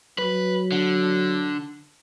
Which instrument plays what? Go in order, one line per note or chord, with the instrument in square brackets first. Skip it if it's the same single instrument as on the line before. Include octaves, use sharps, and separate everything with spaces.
[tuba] F#3 [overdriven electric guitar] B4
[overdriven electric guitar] D3